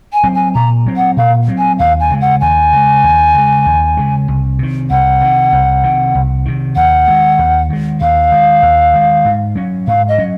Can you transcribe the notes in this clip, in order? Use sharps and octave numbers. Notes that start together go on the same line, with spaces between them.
G#5
F#3 C4
G#5
A#2 A#5
F#3 C4
F#5
A#2 F5
F#3 C4
G#5
D#2 F5
G#5
C#3 G#3
F#5
D#2 G#5
C#3 G#3
D#2
C#3 G#3
D#2
C#3 G#3
C2
C3 D#3
C2 F#5
C3 D#3
C2
C3 D#3
C2
C3 D#3
D#2 F#5
D#3 G#3
D#2
D#3 G#3
D#2 F5
D#3 G#3
D#2
D#3 G#3
G#2
F#3 C#4
G#2 F5
D#5
F#3 C#4